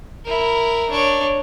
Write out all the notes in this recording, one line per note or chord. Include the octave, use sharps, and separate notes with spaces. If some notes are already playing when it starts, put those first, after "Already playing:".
E4 A#4
D4 C#5